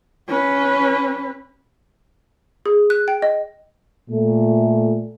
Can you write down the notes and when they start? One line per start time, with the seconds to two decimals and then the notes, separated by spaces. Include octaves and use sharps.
0.28 C#4 B4
2.66 G#4
2.90 F#6
3.08 G5
3.22 D#5
4.10 A#2 A3